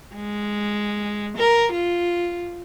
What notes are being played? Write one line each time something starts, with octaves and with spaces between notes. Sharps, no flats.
G#3
A#4
F4